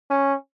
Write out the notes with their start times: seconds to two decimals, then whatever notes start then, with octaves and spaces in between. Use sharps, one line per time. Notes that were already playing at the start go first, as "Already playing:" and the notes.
0.10 C#4